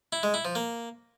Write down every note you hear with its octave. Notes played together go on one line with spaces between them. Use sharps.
E4
G#3
E4
F3
A#3